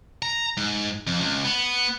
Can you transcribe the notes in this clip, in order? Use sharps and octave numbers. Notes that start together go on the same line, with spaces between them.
A#5
G#2
F2
C#2
B3